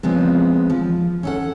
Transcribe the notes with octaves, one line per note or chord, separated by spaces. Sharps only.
C#3 F3 G#3 B3 C4
F3
C#4 A4 F#5